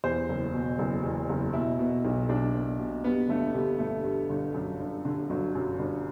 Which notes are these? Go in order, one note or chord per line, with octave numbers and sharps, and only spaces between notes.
E2 C5
F#1
B2
F#1
E2
F#1
B2 E4
B2
B1
B1 D4
B2
B2
G2 B3
G1 A3
D3 G3
G1 A3
G2
G1
F#2
G1
D3
G1 F#3
F#2
G1